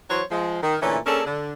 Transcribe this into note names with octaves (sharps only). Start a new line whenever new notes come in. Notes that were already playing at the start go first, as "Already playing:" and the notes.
E3 F#3 C5 C#5
F3 G#3
D#3
A#2 D3 E3 A3 C#4 D4
A#3 C#4 D4 G#4 A4
D3